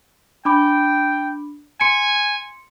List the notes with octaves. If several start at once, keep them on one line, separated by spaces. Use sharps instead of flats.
D4 G5 B5 D6
G#5 C6 C#7 D7